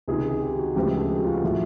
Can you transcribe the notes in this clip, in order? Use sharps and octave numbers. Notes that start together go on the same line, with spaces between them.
C#2 C3 D#3 G#4
G4
F#4
D2 C#3 F3 G#3 B3 G4
G#4
A4
G4
F#4
F4
F#4
A2 F3 A3